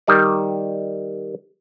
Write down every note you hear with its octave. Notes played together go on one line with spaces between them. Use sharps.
D#3 G3 D5